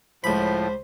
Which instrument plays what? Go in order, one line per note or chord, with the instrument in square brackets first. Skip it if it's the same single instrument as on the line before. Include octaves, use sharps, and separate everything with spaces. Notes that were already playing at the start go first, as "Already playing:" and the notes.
[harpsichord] C#2 B5 [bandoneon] A2 F3 [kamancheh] C5